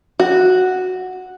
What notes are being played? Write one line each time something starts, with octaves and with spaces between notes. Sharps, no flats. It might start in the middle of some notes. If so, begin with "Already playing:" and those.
F#4